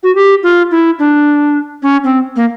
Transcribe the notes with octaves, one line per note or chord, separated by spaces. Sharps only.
F#4
G4
F4
E4
D4
C#4
C4
A#3